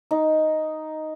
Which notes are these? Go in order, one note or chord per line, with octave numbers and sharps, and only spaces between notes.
D#4